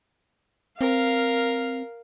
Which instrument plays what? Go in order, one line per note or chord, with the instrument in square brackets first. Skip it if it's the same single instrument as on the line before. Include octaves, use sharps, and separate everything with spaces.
[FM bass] C4 [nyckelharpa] A#4 [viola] F5